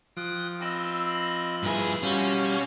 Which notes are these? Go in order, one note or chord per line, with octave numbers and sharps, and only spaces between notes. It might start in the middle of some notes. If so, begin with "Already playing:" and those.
F3 G5 D#6 F#6
C4 D#5 B5 E6
G2 E4 G#4 B4
B2 G3 C#4 F4 F#4